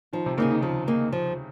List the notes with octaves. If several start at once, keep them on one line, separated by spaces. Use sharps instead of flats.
D#3 F3
C3
C#3 A#3 D#4 G#4
D#3
C#3 F3
A#3 D#4 G#4
F3